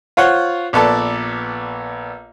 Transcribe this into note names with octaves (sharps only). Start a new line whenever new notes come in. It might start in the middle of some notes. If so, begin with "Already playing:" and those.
F4 C5 C#5 F#5
A#1 B3 A4 D5 A5